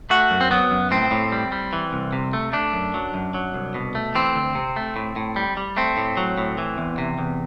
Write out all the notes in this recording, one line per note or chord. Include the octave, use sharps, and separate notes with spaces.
A3 F#4
F#2
C4
F#3 B3
F#2
A2 C4
A2
G3
G3
E3
C2
C3
A3
A3 D4
F#2
F#3
F#2
F#3
C2
B2
A3
E3 C4
D2
C3
A3
A2
A2
G3
G3
A3 C4
A2
F#3
A2
E3
E2
C3
E2